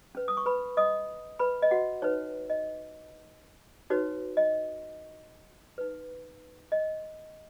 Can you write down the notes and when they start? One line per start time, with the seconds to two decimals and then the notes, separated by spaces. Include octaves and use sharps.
0.15 C#4 B4
0.28 D#6
0.37 C#6
0.46 B4 B5
0.77 D#5 D#6
1.39 B4 B5
1.62 D#5
1.71 F#4 F#5
2.02 D#4 B4 C#5
2.50 D#5
3.90 D#4 F#4 B4 C#5
4.37 D#5
5.78 D#4 B4
6.72 D#5